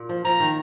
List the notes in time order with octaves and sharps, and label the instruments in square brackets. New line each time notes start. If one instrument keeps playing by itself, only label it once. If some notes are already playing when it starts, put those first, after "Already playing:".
Already playing: [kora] A#2
F3
[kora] F3 [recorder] A#5
[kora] D#3